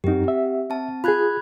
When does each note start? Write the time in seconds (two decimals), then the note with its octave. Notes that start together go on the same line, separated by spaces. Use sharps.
0.04 F#2 C4 D#4 G4
0.28 E5
0.70 C4 A5
1.04 F4 G#4 B5 F#6 G#6